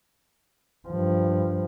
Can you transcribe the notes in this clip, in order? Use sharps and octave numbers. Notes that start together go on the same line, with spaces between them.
G2 F3